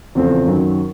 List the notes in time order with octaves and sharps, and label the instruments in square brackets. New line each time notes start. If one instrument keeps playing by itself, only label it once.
[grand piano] E2 C#3 F3 A3 C4
F#2 D#3 F#3